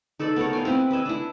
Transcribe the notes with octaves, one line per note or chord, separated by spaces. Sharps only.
D#4 A4 B4 D5
B3 A4 A#4 C#5
F5 G5 G#5
C4 E4 B4
B4 D#5 E5 G#5
D4 E4